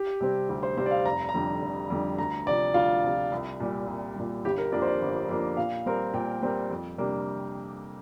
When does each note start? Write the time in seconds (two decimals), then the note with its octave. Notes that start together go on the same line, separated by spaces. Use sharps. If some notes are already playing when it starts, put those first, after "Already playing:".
Already playing: G4
0.21 C3 G3 C4
0.49 D2 G4
0.63 C5
0.77 C3 G3 C4 C5
0.86 D5
0.91 F5
1.05 F1 A#5
1.29 A#5
1.34 F2 D3 G3
1.62 F1
1.90 F2 D3 G3
2.18 D2 A#5
2.46 C3 F3 D5
2.74 D2 F4
3.04 C3 F3
3.32 C2
3.60 A#2 G3
3.87 C2
4.16 A#2 G3
4.44 G1 G4
4.58 A#4
4.72 F2 F3 A#3 D4 D5
4.82 C5
4.87 D5
5.01 G1
5.29 F2 F3 A#3 D4
5.57 A#2 F5
5.86 G3 C4 A#4
6.14 A#2 G5
6.43 G3 C4 A#4
6.71 F2
6.98 C3 G3 A#3 D4